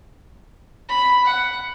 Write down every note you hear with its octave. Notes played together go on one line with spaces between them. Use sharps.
B5
F#5